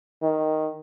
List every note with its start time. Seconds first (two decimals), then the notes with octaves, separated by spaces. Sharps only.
0.22 D#3